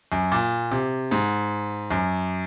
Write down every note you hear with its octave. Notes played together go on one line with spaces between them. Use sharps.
F#2
A#2
C3
G#2
F#2